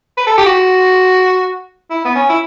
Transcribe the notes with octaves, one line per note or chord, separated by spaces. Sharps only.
B4
A4
G4
F#4
E4
B3
C#4
E4